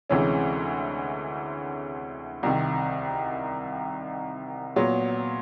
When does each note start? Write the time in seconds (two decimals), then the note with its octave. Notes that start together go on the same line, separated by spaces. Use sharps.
0.10 D2 C3 E3 G#3 C#4
2.43 C2 C3 D#3
4.76 A#2 F#3 B3